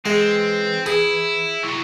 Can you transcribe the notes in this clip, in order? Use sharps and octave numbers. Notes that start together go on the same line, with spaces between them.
E3 G#3 C4
E4 G#4
C2 F#3 E4